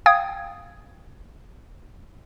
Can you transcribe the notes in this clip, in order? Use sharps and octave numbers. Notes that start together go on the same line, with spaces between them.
F5 G5 D#6 G#6